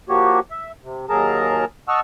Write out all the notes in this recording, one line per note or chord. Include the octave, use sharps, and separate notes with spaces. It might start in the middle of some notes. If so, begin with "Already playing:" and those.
F3 A#3 F#4 G4 C#5
E5
C3
D#2 F#3 G#4 A#4 A5 A#5
D#5 F#5 A5 C#6 E6 F6